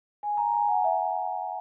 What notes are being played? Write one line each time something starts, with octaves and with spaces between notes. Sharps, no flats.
G#5
A#5
G#5
F#5
E5